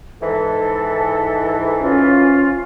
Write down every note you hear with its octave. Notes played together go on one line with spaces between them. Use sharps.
G#2 E3 A4
C#4 F4